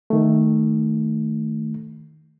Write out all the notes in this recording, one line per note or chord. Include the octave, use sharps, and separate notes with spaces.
D#3 A3